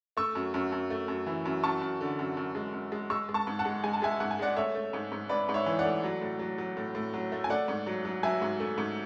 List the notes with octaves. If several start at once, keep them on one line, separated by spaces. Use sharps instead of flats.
A3 C#6 E6
F#2
F#2
F#2
A3
F#2
E3
F#2
F#2 A5 C#6
F#2
D3
F#2
F#2
G#3
F#2
G#3
G#3 C#6 E6
G#3
A5 C#6
G#2
F#5 A5
G#3
G#3 G#5
A5
G#3 E5 G#5
G#2 F#5
G#5
G#3 D5 F#5
A3 C#5 E5
A3
G#2
G#2
G#2 B4 D5
G#2
C#5 E5
E3
D5 F#5
A3
F#3
A2
F#3
F#3
A2
A2
F#3
A3
G#5
A3 D5 F#5
G#2
F#3
F#3
F#3 E5 G#5
G#2
A3
G#2